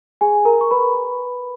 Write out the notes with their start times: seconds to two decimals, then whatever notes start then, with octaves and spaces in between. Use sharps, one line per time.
0.21 G#4 G#5
0.45 A#4 A#5
0.61 C#6
0.71 B4 B5